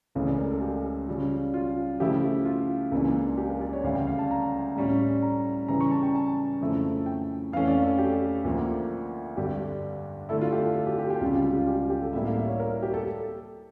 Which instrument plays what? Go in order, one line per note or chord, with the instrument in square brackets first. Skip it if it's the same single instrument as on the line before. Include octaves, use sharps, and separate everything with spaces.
[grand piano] C#2 C#3 E3 A3 C#5
D5
A#4
A4
G4
C#3 G3 C#4 F4
F4
C#3 F3 A3 E4 G4
F4
C#2 C#3 E3 A#3 D4
G4
A#4
D5
C#5
D2 C#3 G3 F5
G5
F5
A5
A#5
A2 G3 C#4
A#5
C#3 E3 G3 C#4 A#5
C#6
A5
G5
A5
F2 C#3 F3 A3 E4
G5
F2 E3 A3 C#4 F5
D5
A4
G4
D2 D3 F3 A#3 F4
G2 D3 G3 D4 G4
D3 A3 E4 A4
F4
G4
A4
A4
G4
G4
G4
C#2 C#3 G3 F4
F4
G4
F4
G4
G4
G4
A4
A2 G3 A#3 E4 E5
F5
E5
C#5
A#4
A#4
G4
A4